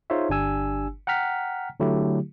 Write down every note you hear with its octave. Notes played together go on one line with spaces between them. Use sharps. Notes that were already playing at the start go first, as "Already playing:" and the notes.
D#4 F4 G#4 C5 C#5 E5
G1 D4 G4 G#5 E6
F#5 G5 A#5 F6 B6
D3 F#3 A3 E4 G4